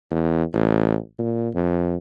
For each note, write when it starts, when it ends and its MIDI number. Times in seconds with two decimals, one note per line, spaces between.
0.11 0.44 40
0.53 0.96 33
1.19 1.49 46
1.54 1.96 41